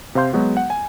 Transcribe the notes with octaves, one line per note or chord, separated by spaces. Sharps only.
C3 C5 F5 C6 G6
F#3 G#3 B3 F#4
F#5
G#5